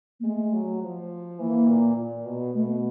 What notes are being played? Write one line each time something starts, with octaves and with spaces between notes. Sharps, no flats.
A#3
G#3 A3
F#3
F3
E3 A#3
A#2
A#2
B2
B2 A3